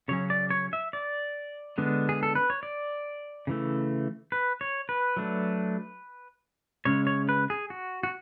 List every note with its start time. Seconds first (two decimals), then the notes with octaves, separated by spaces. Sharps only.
0.08 C#3 F#3 C#4 C#5
0.30 D5
0.51 C#5
0.73 E5
0.93 D5
1.78 D3 G#3 B3 D4
2.09 G#4
2.23 A4
2.35 B4
2.50 C#5
2.63 D5
3.47 C#3 E3 A3
4.32 B4
4.61 C#5
4.89 B4
5.17 F#3 A3 D4
6.85 C#3 G#3 C#4 C#5
7.07 C#5
7.29 B4
7.50 G#4
7.70 F#4
8.03 F#4